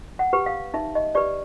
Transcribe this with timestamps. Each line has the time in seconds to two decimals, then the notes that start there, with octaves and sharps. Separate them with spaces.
0.19 F#5
0.33 G4 B4
0.46 F5
0.74 D#4 E5
0.95 D#5
1.15 G4 B4 D5